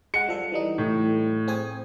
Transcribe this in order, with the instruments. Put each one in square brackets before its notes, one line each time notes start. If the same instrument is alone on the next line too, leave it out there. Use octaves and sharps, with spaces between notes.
[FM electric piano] G#3 F#5 [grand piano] C#7
[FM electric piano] F3 G3 A4
E3 G3 D#4
[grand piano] A2
[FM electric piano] C4 G#4 G#5